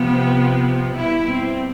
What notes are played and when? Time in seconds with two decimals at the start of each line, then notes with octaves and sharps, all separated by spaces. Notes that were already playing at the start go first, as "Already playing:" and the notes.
Already playing: C3 F3 B3
0.97 B2 G3 E4
1.27 C4